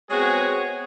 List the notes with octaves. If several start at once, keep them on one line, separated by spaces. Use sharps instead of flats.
G#3 B3 C4 F#4 G#4 C#5